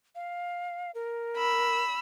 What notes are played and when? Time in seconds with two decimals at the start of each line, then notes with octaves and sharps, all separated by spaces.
0.15 F5
0.94 A#4
1.36 B5 E6